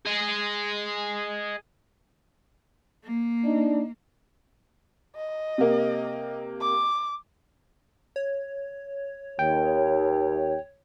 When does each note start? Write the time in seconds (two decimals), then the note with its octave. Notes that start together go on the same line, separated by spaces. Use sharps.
0.05 G#4 D#5
3.04 A#3
3.44 D4 D#4
5.16 D#5
5.58 C3 A#3
6.61 D6
8.16 C#5
9.39 D#2 G5